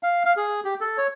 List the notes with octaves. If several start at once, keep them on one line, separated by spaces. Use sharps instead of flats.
F5
F5
G#4
G4
A4
C#5